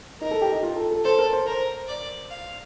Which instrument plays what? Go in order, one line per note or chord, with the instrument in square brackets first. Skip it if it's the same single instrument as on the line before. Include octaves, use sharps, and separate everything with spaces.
[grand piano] D#4 [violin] A#4
[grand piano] A4
G4
D#4
F4
A4
A4
[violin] A4 [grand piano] C5
[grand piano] A#4
C5
[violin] A#4 [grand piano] C5
[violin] D5
F5